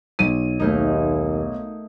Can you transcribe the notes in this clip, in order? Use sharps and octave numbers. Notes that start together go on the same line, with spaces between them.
B1 D#7
D#2 A3 A#3 D#4